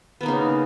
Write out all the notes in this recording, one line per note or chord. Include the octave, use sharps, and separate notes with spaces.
C#3 A#3 B3 D#4